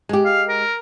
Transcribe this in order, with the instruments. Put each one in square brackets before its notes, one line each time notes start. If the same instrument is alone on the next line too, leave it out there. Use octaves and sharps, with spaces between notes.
[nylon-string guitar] G#3 G4
[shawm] F5
A#4